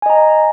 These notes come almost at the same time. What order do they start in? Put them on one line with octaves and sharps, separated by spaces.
G#5 D#5 A#5